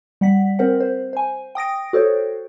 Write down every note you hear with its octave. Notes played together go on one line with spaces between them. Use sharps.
G3 F#5 B6
C4 A#4 C5 F#5
C5
C5 G#5
G5 D#6 A#6 D7
F#4 A4 C5 C#5